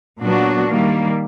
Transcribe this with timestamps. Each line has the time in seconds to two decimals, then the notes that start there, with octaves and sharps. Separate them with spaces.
0.20 A#2 F#3 B3 D4 F#4
0.67 D#3 G3 A#3